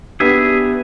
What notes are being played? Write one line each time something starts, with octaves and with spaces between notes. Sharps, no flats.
B3 D4 G4 G#4 E5